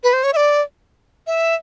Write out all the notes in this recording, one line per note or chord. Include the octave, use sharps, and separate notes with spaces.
B4
C5
C#5
E5
D5
E5